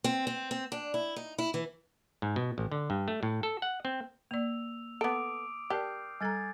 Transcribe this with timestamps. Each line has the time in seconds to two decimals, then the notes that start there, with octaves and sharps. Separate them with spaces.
0.04 C4
0.27 C4
0.51 C4
0.72 D4
0.94 E4
1.16 D#4
1.38 E4
1.54 E3
2.22 G#2
2.36 B2
2.58 A1
2.72 D3
2.90 G2
3.08 A3
3.23 A2
3.43 A4
3.62 F#5
3.85 C4
4.31 A#3 D5 E6 F7
5.01 B3 A4 D6 D#6 D7
5.70 G4 A#4 D5 A5 F6 G6 C7
6.21 G3 A4 G#5 A#5 G#6 A6